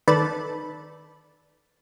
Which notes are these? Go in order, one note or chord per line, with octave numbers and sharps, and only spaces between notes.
D#3 A4 B4 D5 A5 B5